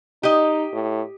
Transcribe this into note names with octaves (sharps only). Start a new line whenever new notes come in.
D#4 G4 D#5
A2